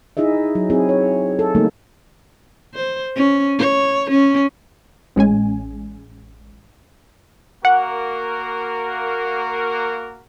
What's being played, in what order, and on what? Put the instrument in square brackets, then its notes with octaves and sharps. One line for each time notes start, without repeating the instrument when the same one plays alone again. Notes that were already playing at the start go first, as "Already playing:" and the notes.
[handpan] D#4 E4 G#4 D#5 E5
F#3
C4 E4 G#4
C#5
A4
D3 G3 A3 A#3 D#4
[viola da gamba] C5
C#4
C#5
C#4
[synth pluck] A1 G#3 C#4 G#5
[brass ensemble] A#3 F#4 A#4 [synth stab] F#5